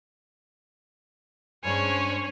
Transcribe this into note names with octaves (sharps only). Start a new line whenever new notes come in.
G2 G#3 C#4 D4 C5 C#5 G#5